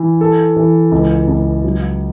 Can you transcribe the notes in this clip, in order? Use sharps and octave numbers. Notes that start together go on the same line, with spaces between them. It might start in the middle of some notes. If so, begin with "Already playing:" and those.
Already playing: E3
A4
E3
C#2
C#2
F#3